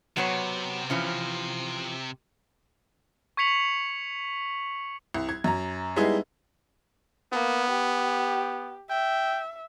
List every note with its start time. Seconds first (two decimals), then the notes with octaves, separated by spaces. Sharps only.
0.17 C3 F#3 B3 C#5
0.90 E3 F3 C#4
3.37 C#6 G#6 B6 C#7 F7 F#7
5.14 C2
5.29 G#6
5.44 F#2 A#5
5.96 G3 G#3 B3 D#4 E4 G#4
7.33 A#3 B3
7.70 G4
8.90 E5 G5